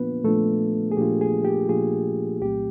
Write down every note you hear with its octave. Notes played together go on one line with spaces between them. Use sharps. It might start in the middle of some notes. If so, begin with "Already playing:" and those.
Already playing: A#2 F3 A#3 B3 D4 F4 B4
A#2 F3 A3 A#3 D4 F4 A4
G#4
A#2 F3 A#3 D4 F4 G4
G#4
G4
A#2 F3 A#3 D4 F4 G#4
C2 A#2 F#3 A3 C4 G4